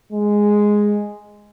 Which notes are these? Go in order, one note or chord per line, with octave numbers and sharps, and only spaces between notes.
G#3